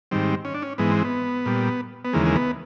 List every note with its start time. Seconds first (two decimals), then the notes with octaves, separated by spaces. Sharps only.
0.11 G#2 D#3 G3 C4
0.45 C#4
0.54 D4
0.62 C#4
0.78 G#2 E3 G#3 B3
0.91 C4
1.05 B3
1.46 A#2 G3
2.05 B3
2.13 D#2 C#3 E3 G#3 A#3
2.26 A#3
2.36 B3